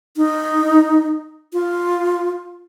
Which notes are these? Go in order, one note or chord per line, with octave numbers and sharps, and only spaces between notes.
D#4
F4